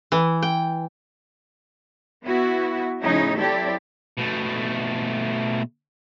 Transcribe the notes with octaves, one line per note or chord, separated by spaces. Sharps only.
E3
G5
B3 E4 F#4
A2 C#3 F3 C#4 D#4 E4
F#3 C4 E4 G4 A4 D5
B2 A3